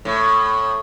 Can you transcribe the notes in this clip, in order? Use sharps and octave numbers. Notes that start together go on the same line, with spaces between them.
A2